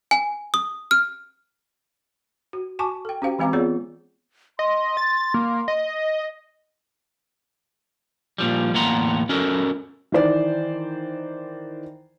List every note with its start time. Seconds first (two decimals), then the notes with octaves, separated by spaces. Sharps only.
0.11 G#5
0.54 D#6
0.91 F6
2.53 F#4
2.79 F#4 G#5 A5 C#6 D6
3.05 A4 G5
3.22 C#4 F#4 G4 C5 F5 G5
3.39 E3 G#3 C4 F5 A#5 D6
3.53 B3 F4 G#4 C#5 D5
4.59 D#5 C6
4.97 A6
5.34 A#3
5.68 D#5
8.38 A#2 F3 G3
8.74 E2 A2 A#3 F#5 A#5 C6
9.29 C#4 F#4 A4 A#4
10.12 D#3 E3 C5 D5